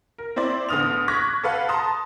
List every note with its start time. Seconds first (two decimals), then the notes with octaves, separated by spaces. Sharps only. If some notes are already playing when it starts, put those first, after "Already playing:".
0.18 A#4
0.36 C4 E4 C5 D5
0.69 A1 D3 B3 D#6 F6 F7
1.08 C#6 D6 F#6 G#6 A#6 B6
1.44 A4 B4 F5 F#5
1.69 A5 A#5 C6 D#6